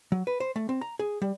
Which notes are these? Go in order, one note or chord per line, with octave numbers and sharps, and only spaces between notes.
F#3
B4
C5
A3
C4
A#5
G#4
G3